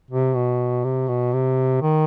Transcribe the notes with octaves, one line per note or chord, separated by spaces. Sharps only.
C3
B2
C3
B2
C3
D#3